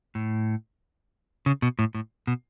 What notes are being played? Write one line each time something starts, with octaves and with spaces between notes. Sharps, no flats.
A2
C#3
B2
A2
A2
B2